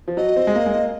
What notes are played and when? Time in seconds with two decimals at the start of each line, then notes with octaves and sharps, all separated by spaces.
0.08 F3
0.17 F#3 D#5
0.36 C4
0.47 G#3
0.55 A#3
0.66 G#3
0.74 A#3